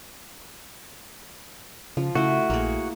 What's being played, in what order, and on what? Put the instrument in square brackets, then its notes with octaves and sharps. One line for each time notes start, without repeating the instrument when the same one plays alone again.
[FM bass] C#3 [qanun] F3
[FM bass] C#3 [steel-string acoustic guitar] A3 [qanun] E4 C5 [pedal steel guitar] F#4
[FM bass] A#1 [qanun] A#3 G#4